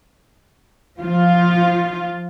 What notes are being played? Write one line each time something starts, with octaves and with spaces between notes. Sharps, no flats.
F3 F4